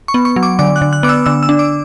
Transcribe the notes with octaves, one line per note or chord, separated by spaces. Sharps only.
C#6
B3
C#6
F#3
D6
D3 D6
F#6
D3
F#6
B3 D6
E6
D3 E6
E6
D4
D6